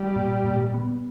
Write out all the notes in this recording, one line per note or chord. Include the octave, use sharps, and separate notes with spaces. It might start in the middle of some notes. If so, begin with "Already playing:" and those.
Already playing: G3
A#2
A#2
B3